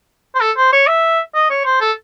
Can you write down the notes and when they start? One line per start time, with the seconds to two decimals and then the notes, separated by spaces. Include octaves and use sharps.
0.35 C5
0.41 A4
0.57 C5
0.73 C#5
0.87 E5
1.35 D#5
1.50 C#5
1.65 C5
1.81 A4